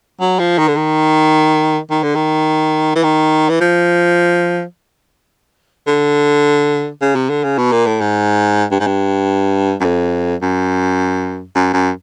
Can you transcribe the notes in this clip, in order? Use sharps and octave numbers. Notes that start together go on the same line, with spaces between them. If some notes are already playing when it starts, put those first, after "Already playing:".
F#3
F3
D#3
D3
D#3
D#3
D3
D#3
E3
D#3
E3
F3
D3
C#3
C3
D3
C#3
B2
A#2
A2
G#2
G2
G#2
G2
F#2
F2
F#2
F#2
F#2